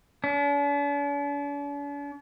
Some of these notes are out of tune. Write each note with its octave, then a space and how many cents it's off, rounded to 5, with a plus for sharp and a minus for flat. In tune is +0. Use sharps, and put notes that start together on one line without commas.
D4 -45